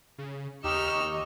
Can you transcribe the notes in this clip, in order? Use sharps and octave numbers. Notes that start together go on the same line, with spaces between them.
C#3
D#2 D#4 G4 D#5 C#6 E6 F6